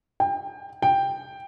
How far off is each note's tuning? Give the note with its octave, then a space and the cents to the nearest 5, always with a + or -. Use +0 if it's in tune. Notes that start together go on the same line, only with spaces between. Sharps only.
G5 +25
G5 +5